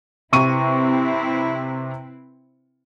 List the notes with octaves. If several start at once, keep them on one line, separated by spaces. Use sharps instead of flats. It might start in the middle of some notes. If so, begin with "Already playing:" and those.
C3 C4 E4 B4 C#6 D#7